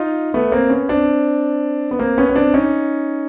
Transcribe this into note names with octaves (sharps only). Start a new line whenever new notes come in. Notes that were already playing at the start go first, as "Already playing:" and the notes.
Already playing: D#4 F4
A3 B3
A#3 C4
B3 C#4
C4 D4
B3
A#3 C4
B3 C#4
C#4
C4 D4
C#4 D#4